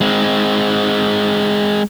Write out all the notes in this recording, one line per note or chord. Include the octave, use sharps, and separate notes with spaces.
G#3 C4